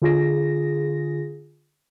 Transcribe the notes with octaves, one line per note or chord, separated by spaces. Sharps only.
D3 F4 G#4 A#6